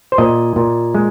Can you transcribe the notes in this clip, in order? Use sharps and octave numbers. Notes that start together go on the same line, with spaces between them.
C5
A#2 D#5
A#2
G#3